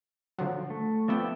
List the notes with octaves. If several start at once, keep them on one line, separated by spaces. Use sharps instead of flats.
D3 F3 F#3
A3
F3 B3 D5 E5 G5